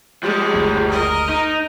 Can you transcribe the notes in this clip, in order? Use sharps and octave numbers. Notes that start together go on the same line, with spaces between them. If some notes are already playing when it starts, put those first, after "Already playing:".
F3 G3 G#3
F#1 D2
A#4 D#5
D#4